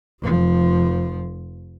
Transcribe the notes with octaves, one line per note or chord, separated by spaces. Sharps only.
F1 F3